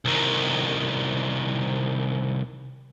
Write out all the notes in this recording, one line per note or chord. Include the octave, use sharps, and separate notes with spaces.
C2 D#3